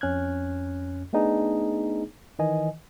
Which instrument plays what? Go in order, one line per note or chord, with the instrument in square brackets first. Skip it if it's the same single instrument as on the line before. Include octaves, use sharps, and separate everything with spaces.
[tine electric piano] F2 C#4 F6 F#6 G#6
A3 B3 D4 D#4 G#4
D#3 E3 D#5 G#5